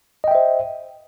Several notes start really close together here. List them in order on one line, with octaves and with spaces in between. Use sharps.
D#5 G5 E5 C5